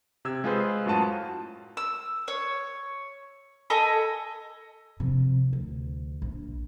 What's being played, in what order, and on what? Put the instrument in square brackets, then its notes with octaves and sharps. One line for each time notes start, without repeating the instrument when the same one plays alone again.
[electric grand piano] C3 E6 G#6
G#3 F4 G#4 B4 C5
F#2 A2 F4 F#4 A5 D#7
[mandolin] E6
C#5
A4 D#5 G#5 B5
[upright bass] C3 F3
D2
A#1